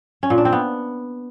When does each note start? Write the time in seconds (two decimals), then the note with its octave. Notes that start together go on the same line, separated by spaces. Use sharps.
0.23 C#4
0.30 A#2
0.38 D4
0.45 C4
0.53 B3